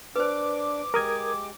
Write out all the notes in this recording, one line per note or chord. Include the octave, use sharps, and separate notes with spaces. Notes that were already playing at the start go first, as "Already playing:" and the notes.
D4 B4 C5 D6
G#3 G4 A#4 D#6 G#6